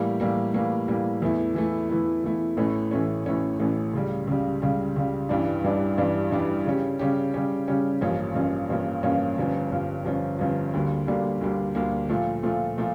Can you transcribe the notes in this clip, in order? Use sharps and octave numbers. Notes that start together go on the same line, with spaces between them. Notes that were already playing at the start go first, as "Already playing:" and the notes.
Already playing: A2 E3 G3 A#3
A2 E3 G3 A#3
A2 E3 G3 A#3
A2 E3 G3 A#3
E2 E3 A3 E4
E2 E3 A3 E4
E2 E3 A3 E4
E2 E3 A3 E4
A1 A2 E3 A3 C#4
A1 A2 E3 A3 C#4
A1 A2 E3 A3 C#4
A1 A2 E3 A3 C#4
C#2 C#3 G3
C#2 C#3 G3
C#2 C#3 G3
C#2 C#3 G3
A1 G2 E3 G3 D4
A1 G2 E3 G3 D4
A1 G2 E3 G3 D4
A1 G2 E3 G3 D4
C#3 G3 C#4 G4
C#3 G3 C#4 G4
C#3 G3 C#4 G4
C#3 G3 C#4 G4
A1 G2 F3 A#3 C#4
A1 G2 F3 A#3 C#4
A1 G2 F3 A#3 C#4
A1 G2 F3 A#3 C#4
G1 G2 F3 C#4
G1 G2 F3 C#4
G1 G2 F3 C#4
G1 G2 F3 C#4
D2 D3 G3 A#3
D2 D3 G3 A#3
D2 D3 G3 A#3
D2 D3 G3 A#3
A#2 F3 A3
A#2 F3 A3
A#2 F3 A3